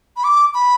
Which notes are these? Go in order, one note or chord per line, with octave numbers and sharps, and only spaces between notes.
B5
D6
B5